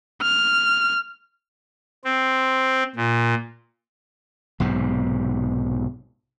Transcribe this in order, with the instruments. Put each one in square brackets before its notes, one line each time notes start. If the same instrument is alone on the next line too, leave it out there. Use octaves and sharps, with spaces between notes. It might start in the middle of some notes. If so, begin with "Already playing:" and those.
[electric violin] F6
[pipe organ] C4
A#2
[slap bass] B1 G#2 C3